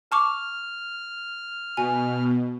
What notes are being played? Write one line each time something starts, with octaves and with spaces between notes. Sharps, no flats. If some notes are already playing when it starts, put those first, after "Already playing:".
A5 C#6 D6 F6
B2 G#5